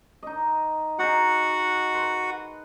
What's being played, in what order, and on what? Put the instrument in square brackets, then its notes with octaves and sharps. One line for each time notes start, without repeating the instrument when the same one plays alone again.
[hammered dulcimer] D#4 D#5
[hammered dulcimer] D#4 G#4 [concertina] F#4 F#5
[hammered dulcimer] B4 C6